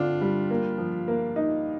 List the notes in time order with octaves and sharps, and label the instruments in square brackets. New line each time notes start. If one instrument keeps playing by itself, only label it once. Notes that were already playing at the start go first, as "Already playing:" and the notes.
Already playing: [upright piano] D3 C4 [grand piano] D4 F4
[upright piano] G3
A#3
F3
A#3
D#4